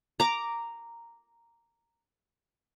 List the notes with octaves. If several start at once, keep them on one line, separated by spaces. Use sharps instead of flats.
A#5 D6